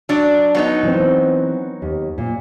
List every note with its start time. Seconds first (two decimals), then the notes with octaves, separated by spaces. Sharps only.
0.09 F#3 D4
0.55 F#3 B3 D#4
0.83 E3 C4
1.82 D#2
2.18 A#2